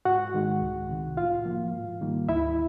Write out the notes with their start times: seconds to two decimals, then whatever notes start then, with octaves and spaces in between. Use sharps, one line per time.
0.05 G#2 F#4 F#5
0.34 D#3 G#3
0.62 C2
0.89 C3 D#3
1.17 A2 F4 F5
1.45 F3 A#3
1.73 G#2
2.01 D#3 G3 A#3
2.28 D2 E4 E5